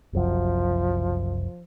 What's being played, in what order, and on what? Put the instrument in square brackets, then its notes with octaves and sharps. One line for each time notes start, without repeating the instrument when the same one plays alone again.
[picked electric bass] F#1 C2 F#2 [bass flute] F3